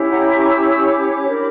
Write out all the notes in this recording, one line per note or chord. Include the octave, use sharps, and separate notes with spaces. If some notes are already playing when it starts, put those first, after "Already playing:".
Already playing: C#4 E4 G4 C#5
F#5 A#5
G5 B5
A#5 C#6
B5 D6
C#6 E6
C#6 E6
B5 D6
D4 G4 A#4